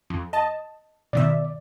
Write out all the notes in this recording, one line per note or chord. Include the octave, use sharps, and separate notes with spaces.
F2
D#5 A5
B2 D#3 D5 E5